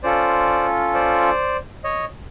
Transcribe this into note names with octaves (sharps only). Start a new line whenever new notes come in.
C#4 F4 A4 C5 D5
C5 D5
C#5 D#5